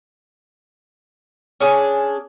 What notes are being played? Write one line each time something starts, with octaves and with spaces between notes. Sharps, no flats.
C#4 D4 G#4 G#5